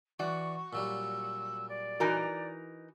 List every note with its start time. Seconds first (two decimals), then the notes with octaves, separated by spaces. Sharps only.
0.19 E3 F#4 D5 C#6
0.73 A#2 F#3 G3 E6
1.69 D5
2.00 E3 D#4 F#4 A#4 G#5 A#5